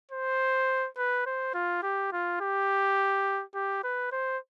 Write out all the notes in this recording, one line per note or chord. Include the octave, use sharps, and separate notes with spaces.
C5
B4
C5
F4
G4
F4
G4
G4
B4
C5